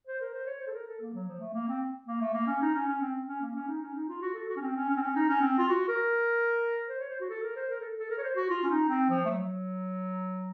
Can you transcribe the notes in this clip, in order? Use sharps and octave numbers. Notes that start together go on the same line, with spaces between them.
C5
A#4
C5
C#5
C5
A4
A#4
A4
A#3
F#3
F3
A3
A#3
C4
A#3
A3
A#3
C#4
D#4
C#4
C#4
C4
C#4
A#3
C#4
D#4
C#4
D#4
F4
F#4
A4
F#4
C#4
C4
C#4
C#4
C4
C#4
D#4
C#4
C4
F4
F#4
A#4
C5
C#5
C5
F#4
A4
A#4
C5
A#4
A4
A4
A#4
C#5
C5
F#4
F4
C#4
D#4
C4
F3
A3
F#3